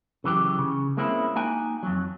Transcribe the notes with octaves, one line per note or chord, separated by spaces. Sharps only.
C#3 E3 F#3 G4
C#3
G#3 A#3 C4 C#4 E4
A#3 D#4 F#4 G5 G#5
F2 F#3